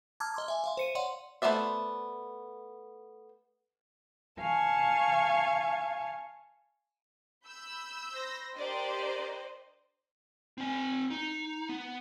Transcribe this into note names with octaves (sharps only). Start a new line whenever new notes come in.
A5 A#5 D6 E6 F6 G#6
D#5 C6 D6
E5 G#5
E5 F5 C6
C5 C#7 D#7
C#5 D5 F5 F#5 C6
A3 B3 C5 D5 E5
F5 G#5 A5 C#6
B5 E6 G6
C5 A#6
D4 G4 A#4 C5 D5 D#5
C4 G#5
D#4
B3